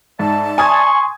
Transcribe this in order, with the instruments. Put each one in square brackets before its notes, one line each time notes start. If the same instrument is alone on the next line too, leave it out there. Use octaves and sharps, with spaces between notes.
[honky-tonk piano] G#2 [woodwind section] D5 E5 A5
[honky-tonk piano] G#5 D#6 G#6 [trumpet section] C6 C#6